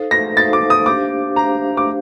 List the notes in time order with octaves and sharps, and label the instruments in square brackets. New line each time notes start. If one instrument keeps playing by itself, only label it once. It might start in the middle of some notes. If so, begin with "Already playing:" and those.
Already playing: [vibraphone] D#4 A4 C5 F5
[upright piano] A#6
[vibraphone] D#4 A4 C5 F5 [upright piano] A6
[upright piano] D6
D#6
[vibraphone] D4 G4 C5 F5 [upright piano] D6
[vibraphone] D4 G4 C5 F5 [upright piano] A#5
[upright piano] D6